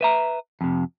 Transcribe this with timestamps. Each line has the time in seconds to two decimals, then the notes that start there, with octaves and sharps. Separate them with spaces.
0.01 B4 E5 A#5
0.61 F2 C3